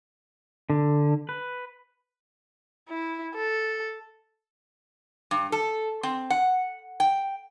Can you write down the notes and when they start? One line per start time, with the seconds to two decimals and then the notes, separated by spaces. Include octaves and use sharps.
0.70 D3
1.29 B4
2.89 E4
3.35 A4
5.31 G2
5.52 A4
6.03 C4
6.30 F#5
7.00 G5